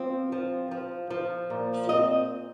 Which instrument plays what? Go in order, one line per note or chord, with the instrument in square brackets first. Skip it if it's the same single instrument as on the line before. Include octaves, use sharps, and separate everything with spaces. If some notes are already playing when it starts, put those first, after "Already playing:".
Already playing: [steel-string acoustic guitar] F3 C4
F3
F3
F3
A#2
C4 D#5